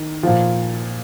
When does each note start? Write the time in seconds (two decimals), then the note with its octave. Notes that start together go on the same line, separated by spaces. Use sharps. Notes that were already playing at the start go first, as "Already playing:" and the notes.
Already playing: D#3
0.23 A#2 F3